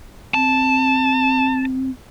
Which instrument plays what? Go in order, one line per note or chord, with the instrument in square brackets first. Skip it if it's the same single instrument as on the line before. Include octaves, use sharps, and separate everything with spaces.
[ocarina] C4 [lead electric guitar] A5